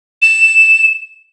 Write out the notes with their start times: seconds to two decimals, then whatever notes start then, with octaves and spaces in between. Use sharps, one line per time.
0.22 E7